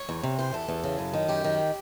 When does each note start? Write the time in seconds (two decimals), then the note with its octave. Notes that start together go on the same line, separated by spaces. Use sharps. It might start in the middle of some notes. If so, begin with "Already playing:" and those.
Already playing: C#5
0.09 E2
0.24 C3
0.39 E3 C5
0.54 E2 A4
0.69 E2
0.84 C#3
0.99 F#2
1.14 D#3
1.28 F#2 G4
1.44 D#3